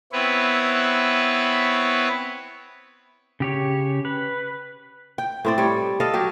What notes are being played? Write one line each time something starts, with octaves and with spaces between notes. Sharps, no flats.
B3 C4 E4 B4 C#5
C#3 G4 C#5
B4
G5
A2 C4 D5
G3 C#5
A4 D#5 F5
F#3 G4